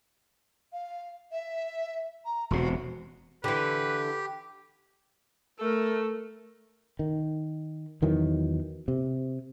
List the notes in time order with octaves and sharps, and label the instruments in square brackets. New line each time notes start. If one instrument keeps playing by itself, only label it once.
[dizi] F5
E5
A#5
[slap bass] E1 C3 [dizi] F#4
[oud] D3 E3 [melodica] G4 [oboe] B4
[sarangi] A3 [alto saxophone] A4 [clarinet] A#4
[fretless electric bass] D#3
E2 D#3 E3 F#3
C3